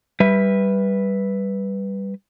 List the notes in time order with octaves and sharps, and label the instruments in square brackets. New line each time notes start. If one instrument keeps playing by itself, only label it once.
[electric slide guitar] G3 B4 E5